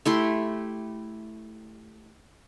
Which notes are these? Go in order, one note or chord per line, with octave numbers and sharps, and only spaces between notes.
A3 E4 G4 C6